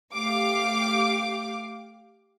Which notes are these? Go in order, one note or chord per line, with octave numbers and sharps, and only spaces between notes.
A3 G4 F5 D6